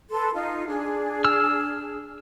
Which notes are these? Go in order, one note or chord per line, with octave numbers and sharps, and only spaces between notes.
A4 B4 C6
D#4 F4
D4 G#4
E6 F6